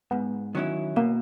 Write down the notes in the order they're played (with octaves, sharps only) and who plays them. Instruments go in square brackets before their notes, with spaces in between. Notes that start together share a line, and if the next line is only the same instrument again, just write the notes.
[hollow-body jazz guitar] G#2 [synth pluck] B3
[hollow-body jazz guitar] D#3 F#3 C#4 E4
[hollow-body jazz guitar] B2 [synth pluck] A#3